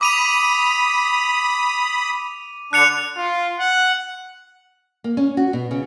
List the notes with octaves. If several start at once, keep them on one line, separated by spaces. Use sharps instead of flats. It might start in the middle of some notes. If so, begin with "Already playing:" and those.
B5 D6 D#6 D#7 F7
D3 D4 F#6 C#7 F7
F4
F#5
A#3
C#4
F#4
B2
C#3